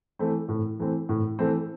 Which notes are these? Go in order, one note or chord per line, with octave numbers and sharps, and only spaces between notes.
E3 A3 C4
A2
E3 A3 C4
A2
E3 A3 C4